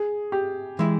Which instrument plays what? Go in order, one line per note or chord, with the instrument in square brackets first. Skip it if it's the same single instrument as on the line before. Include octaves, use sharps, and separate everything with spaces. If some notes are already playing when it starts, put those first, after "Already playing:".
Already playing: [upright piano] G#4
G4
[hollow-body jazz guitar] E3 G#3 E4